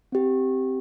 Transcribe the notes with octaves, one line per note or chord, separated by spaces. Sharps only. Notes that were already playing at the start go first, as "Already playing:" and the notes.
C4 G4